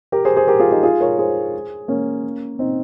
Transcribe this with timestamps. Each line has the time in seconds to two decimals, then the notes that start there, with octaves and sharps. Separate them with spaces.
0.12 G4 A#4
0.25 G#4 C5
0.36 G#4 C5
0.47 G4 A#4
0.60 F4 G#4
0.71 D#4 G4
0.83 F4 G#4
1.00 A#4 C#5
1.19 G#4 C5
1.88 A#3 C#4
2.59 C4 D#4